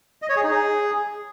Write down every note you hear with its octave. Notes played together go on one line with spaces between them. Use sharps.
D#5
C#5
G#4
D#4
G#4